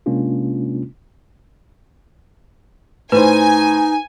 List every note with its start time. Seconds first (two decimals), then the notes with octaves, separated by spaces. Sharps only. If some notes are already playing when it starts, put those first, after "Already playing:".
0.06 C3 G#3 A#3 C#4 D4 F4
3.12 A2 D#4 B4 C5 G#5